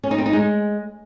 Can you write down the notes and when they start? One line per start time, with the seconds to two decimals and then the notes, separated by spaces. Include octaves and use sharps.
0.04 C#4
0.11 D#4
0.18 C4
0.26 D#4
0.33 G#3